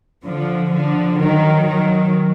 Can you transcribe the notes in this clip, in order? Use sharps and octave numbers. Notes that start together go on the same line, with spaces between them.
D3 F3
D3 F3
D#3 F#3
D#3 F#3